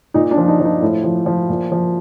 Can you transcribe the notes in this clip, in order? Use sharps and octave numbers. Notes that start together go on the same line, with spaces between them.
A#2 D#4
D4
F3
D#4
F3
D#4
A2
F3
F3
A#2
F3